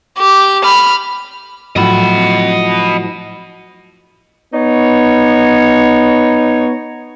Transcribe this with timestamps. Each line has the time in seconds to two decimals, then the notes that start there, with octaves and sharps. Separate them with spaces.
0.18 G4
0.64 B5 F6
1.76 A2 F3 F#3 D#5 B5
4.53 B3 D#4 C#5